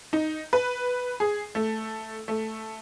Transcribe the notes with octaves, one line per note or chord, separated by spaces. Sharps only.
D#4
B4
G#4
A3
A3